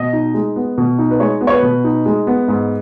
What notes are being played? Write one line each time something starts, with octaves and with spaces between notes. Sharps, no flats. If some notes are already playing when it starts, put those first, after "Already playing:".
Already playing: B2 D#5
D#4
G#3
B3
B2
D#4
B4
G#3 C#5
B3
C#5
B4
B2
D#4
G#3
B3
G#2